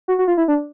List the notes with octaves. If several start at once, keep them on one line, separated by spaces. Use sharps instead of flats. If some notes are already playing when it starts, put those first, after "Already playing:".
F#4
F#4
F4
E4
D4